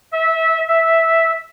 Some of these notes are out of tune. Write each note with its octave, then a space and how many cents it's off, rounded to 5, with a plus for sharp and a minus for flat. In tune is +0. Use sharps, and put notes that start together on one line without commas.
E5 -20
E5 -5